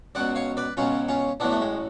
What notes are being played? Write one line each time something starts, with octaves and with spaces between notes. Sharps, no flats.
C#2 B2 F#3 D5 F#5
C#5 F5
B4 D5
C#2 B2 F#3 C#4 F4
C#4 F4
A1 A2 F#3 B3 D4
A3
G#3